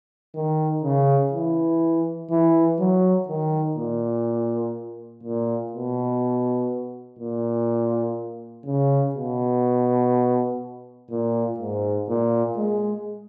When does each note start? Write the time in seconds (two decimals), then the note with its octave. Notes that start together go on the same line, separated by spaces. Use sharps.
0.35 D#3
0.83 C#3
1.32 E3
2.30 E3
2.79 F#3
3.28 D#3
3.76 A#2
5.23 A#2
5.73 B2
7.19 A#2
8.66 C#3
9.15 B2
11.10 A#2
11.58 G#2
12.08 A#2
12.57 G#3